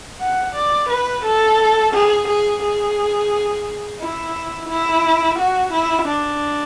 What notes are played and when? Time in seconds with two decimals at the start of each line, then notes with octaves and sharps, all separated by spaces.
0.20 F#5
0.55 D5
0.89 B4
1.24 A4
1.94 G#4
2.28 G#4
2.62 G#4
4.01 E4
4.69 E4
5.39 F#4
5.73 E4
6.07 D4